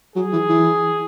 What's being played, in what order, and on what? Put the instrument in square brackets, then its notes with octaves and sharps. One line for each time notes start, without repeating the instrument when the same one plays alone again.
[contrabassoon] F#3 [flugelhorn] G#4
[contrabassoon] E3
E3